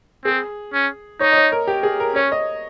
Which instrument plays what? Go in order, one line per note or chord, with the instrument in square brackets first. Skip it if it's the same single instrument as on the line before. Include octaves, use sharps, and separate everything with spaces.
[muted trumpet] C4 [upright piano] G#4
[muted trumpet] C#4
[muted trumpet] D#4 [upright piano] C#5
[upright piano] D#5
C#5
A#4
G4
G#4
A#4
[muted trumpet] C#4 [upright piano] C#5
[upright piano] D#5